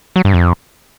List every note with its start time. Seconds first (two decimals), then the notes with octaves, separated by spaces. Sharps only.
0.16 F#3
0.25 G2
0.34 F2